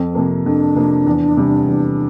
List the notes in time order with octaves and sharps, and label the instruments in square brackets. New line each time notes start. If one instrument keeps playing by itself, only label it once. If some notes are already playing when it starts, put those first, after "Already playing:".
Already playing: [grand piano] F2 [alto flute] C4
[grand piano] C3 F3 A#3
[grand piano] F2 [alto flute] D4
[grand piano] C3 F3 A#3
E2
C3 G3
E2